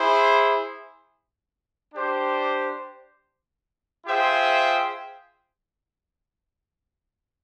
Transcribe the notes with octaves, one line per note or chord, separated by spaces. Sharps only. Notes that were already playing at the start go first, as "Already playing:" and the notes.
Already playing: E4 G#4 C5
D4 G4 C5
F4 G#4 C5 E5 G5